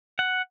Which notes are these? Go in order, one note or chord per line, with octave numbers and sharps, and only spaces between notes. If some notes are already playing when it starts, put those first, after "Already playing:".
F#5